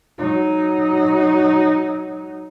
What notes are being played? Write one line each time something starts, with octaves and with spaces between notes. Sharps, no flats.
F#3 D#4